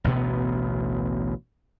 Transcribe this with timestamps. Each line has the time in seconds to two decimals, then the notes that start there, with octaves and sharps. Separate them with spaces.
0.04 A1 D2 B2 B3